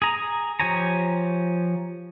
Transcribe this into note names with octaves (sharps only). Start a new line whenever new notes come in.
G#4 A#5
F3 G4 C#5 G#5 A#5